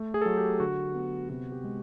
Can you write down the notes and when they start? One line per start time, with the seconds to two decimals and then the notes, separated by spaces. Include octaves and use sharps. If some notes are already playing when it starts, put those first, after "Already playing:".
Already playing: A3
0.14 G#4
0.22 A4
0.26 F#3 G#4
0.37 G4
0.60 D3 F#4
0.94 B3
1.29 C3 F#4
1.52 G4
1.64 G#3